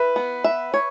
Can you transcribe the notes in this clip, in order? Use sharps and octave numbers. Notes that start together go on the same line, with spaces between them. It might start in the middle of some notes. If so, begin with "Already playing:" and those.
Already playing: E4 B4
B3
E5
C#5